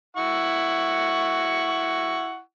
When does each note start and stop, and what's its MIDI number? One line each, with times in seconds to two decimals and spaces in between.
0.17 2.40 64
0.17 2.40 78
0.17 2.40 85